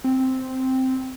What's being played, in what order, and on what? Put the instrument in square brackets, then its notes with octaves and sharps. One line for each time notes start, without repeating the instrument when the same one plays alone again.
[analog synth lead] C4